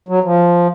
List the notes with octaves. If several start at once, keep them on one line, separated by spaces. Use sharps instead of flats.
F#3
F3